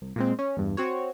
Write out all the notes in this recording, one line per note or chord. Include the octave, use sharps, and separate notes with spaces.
C2
A#2 G#3 C4
C#4
E2 G2
C4 F#4 C#5